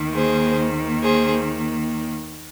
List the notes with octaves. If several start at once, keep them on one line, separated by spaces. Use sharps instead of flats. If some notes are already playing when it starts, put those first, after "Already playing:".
Already playing: D#2 D#3 A#3
G#4 C5
G#4 C5